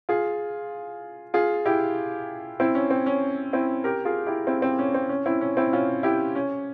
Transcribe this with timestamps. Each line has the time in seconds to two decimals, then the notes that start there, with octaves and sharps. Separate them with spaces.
0.09 F4 G#4
1.34 F4 G#4
1.65 E4 G4
2.60 C4 E4
2.75 C#4
2.91 C4
3.06 C#4
3.53 C4 E4
3.84 G4 A#4
4.05 F4 G#4
4.27 E4 G4
4.47 C4 E4
4.62 C4
4.79 C#4
4.94 C4
5.09 C#4
5.26 C4 E4
5.41 C#4
5.57 C4 E4
5.73 C#4 F4
6.03 E4 G4
6.35 C#4